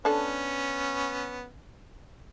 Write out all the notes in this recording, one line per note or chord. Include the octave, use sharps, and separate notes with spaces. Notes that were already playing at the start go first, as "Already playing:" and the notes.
B3 C#4 D4 A4